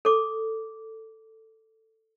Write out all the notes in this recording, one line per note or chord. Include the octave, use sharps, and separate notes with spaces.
A4 D6